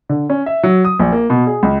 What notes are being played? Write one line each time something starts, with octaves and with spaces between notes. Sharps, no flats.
D3
C#4
E5
F#3
D#6
A#1
A#3
B2
G#4
C#2